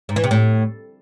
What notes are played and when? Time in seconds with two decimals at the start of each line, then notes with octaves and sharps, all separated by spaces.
0.09 G#2
0.16 E3
0.24 C3
0.31 A2